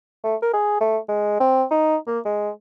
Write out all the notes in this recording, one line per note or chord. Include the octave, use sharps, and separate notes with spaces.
A3
A#4
G#4
A3
G#3
C4
D#4
A#3
G#3